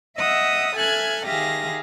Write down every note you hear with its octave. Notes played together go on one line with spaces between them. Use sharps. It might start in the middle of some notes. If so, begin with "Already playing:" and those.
D#5 E5 F#5 D#6 E6
A4 E5 G#5 F6 F#6 G#6
D#3 G4 G#4 E5 F5 A#6